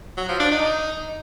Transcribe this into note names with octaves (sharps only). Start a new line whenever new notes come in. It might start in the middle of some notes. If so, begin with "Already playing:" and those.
F#3
F3
D4
D#4